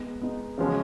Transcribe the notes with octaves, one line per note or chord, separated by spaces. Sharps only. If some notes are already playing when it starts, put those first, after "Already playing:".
Already playing: G#3 B3 D#4
G#3 B3 D#4
C#3 F3 G#3 C#4 F#4